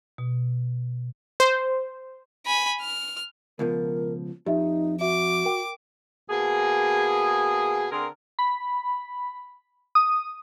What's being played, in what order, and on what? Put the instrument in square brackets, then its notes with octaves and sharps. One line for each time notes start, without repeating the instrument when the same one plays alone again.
[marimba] B2
[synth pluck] C5
[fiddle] G#5 B5
F6
[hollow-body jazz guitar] C#2 B2 F3 [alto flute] A#4
[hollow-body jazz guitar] F2 [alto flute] D#4 [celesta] G4 D#5 E5
[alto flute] F#4 [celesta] E5 [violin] D6
[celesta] A#4 G5
[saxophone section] B2 A#3 G#4
D3 C4 G#4 A#4
[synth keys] B5
D#6